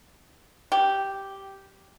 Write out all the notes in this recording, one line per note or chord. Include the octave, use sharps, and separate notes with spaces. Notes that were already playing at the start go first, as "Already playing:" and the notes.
G4